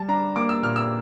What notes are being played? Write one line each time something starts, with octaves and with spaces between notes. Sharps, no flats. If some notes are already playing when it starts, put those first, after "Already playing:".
Already playing: G3 A5
D4 A#5
A#3 D6
E6
A#2 F6
E6